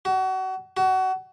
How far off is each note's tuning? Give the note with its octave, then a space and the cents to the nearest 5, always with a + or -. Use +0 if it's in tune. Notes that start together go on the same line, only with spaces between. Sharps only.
F#4 +30
F#4 +25